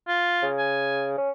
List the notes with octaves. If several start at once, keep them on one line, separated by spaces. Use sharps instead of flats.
F4
C#3
G#5
C#4